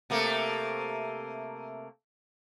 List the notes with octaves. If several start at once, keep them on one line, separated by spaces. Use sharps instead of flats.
C3 A3 A#3